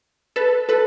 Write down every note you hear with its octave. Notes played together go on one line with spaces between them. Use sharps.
A4 B4
A4 B4